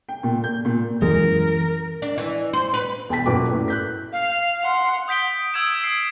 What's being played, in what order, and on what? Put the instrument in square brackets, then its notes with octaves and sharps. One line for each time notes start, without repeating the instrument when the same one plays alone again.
[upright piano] G5
A#2
G6
A#2
[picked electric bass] F#2 G#3 [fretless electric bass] E3 [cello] A#4
[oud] D4
E3
C5
B4
[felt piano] E1 B3 G5 A5 B6
F#2 A#2 F#4 B4 D6
A2
F#6 G6 B6
[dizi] F5
[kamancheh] F#5 C6
[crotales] D#6 G6 B6 D7 G7
D#6 E6 G#6 D7 E7
E6 C7